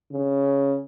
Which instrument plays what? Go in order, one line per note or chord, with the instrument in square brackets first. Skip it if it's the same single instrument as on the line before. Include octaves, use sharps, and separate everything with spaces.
[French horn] C#3